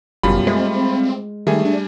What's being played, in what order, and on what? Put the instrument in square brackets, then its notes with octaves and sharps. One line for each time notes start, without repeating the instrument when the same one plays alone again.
[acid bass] G1 [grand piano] F#2 B2 [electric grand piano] G3 F4 B5
[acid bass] G#3 [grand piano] A3 [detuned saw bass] C4
[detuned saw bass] D#3 [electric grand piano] G3 G#5 [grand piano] A3 G#4
[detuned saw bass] D4